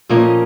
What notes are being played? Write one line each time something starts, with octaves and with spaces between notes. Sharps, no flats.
A#2 F3 A#3 C#4 D#5